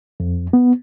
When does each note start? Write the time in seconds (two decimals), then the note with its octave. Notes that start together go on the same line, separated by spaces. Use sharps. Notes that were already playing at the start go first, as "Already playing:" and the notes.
0.20 F2
0.53 B3